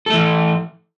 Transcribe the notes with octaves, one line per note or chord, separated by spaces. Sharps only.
E3 A3 A4